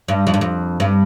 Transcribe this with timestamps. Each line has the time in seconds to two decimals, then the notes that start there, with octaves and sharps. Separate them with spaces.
0.08 G2
0.27 F2
0.34 G2
0.41 F2
0.80 G2